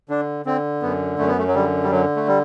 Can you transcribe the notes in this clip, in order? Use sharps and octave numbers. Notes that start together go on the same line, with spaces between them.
D3 D4
D3 C4
F#2 B3
F#2 A3
B3
A3
F#3
D3 G3
G3
D3 F#3
A3
G3